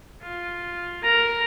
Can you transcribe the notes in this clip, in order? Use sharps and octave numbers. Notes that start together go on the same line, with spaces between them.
F4
A#4 A#5